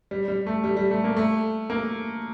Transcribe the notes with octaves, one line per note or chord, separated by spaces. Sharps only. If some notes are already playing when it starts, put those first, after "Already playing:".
G3
G3
A3
G3
G3
A3
A#3
A3
A#3